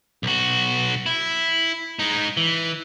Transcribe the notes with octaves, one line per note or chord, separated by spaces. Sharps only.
B1 F#4
E4
G#3 D#4
E3